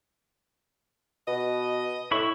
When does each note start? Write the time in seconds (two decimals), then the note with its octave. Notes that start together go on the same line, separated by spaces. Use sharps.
1.27 B2 D#5
2.11 A2 E4 B5 C#6